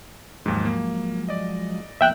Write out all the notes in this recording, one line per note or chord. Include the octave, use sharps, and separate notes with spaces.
D#2 G#2 F3 F#3 G#3
A#3
D5 D#5
F3 A#3 B3 E5 G5 F#6